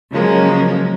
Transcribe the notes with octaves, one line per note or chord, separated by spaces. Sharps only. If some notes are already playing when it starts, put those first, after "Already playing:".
C#3 F3 F#3 G#3 A#3 C#4